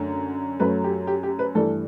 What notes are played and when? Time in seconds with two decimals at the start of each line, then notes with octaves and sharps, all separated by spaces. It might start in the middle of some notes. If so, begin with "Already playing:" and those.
Already playing: F#2 D3 A3
0.60 F#2 F#3 A3 B4
0.84 G4
1.07 G4
1.23 G4
1.39 B4
1.55 G2 E3 A3 A4